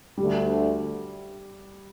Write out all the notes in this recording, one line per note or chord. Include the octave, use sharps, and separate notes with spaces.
D2 D3 G3 A3